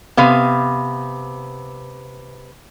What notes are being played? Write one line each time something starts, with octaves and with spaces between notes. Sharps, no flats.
C3 B3 F5